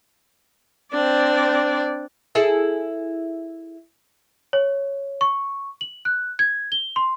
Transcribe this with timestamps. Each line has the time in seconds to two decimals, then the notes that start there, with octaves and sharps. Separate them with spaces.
0.92 C4 D4 D5
2.35 E4 G#4 A4
4.53 C#5
5.21 C#6
5.81 F#7
6.05 F#6
6.39 G#6
6.72 G7
6.96 C6